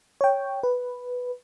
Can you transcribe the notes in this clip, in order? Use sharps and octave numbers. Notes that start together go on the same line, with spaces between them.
C#5 G5
B4